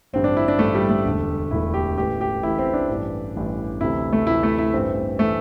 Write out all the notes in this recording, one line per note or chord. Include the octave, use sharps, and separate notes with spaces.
A1 G2 D3 C4
D4
E4
D4
A1 G2 D3 A3
G3
A3
E1 D2 D3
E1 D2 D3 E4
G4
A1 A2 E3 G4
G4
A1 A2 E3 E4
C4
D4
A1 G2 E3
A1 G2 E3
D2 C3 E3 E4
A3
D2 C3 E3 E4
A3
E4
A1 G2 E3 C4
E3 A3